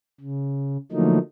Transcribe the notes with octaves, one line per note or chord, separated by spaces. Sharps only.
C#3
D3 F3 F#3 A3 A#3 D#4